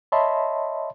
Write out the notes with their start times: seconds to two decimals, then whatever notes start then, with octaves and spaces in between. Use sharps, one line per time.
0.12 C#5 D#5 E5 A5 B5 C6